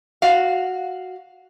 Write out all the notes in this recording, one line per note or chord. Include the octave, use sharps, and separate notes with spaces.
F#4 F5